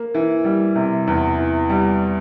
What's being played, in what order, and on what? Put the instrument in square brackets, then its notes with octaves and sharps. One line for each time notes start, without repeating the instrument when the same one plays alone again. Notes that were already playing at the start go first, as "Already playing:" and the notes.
Already playing: [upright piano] A#3
E3
G3
C3
E2
E3
G3